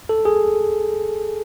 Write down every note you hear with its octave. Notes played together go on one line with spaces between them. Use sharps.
A4
G#4